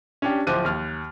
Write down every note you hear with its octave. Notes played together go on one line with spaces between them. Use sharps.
C#4 D4 G4
D1 F3 D6 F#6 D#7
D#2 F6